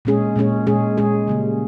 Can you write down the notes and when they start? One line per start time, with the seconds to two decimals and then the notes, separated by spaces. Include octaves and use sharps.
0.05 A#2 G#3 C#4 G#4
0.36 A#2 G#3 C#4 G#4
0.67 A#2 G#3 C#4 G#4
0.97 A#2 G#3 C#4 G#4
1.27 C#3 G3 A#3